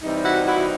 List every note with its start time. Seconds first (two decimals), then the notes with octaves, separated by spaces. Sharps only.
0.03 C3 E3 G3 C4 D#4
0.25 E4 F#4
0.47 E4 F#4